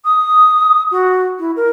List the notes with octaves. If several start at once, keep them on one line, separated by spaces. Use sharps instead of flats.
D#6
F#4
E4
A#4